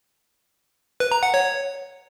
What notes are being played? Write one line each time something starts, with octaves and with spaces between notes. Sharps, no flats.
B4
A#5
F#5
C#5